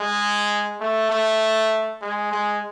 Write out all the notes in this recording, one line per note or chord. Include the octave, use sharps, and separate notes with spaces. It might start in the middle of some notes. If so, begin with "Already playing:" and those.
Already playing: G#3
A3
A3
G#3
G#3